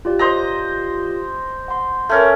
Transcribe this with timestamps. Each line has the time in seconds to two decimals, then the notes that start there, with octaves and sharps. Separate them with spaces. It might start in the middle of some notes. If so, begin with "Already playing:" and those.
0.05 F4 G4 D5
0.19 C5 D#5 A#5
1.68 F#5 C6
2.09 A3 C#4 A#4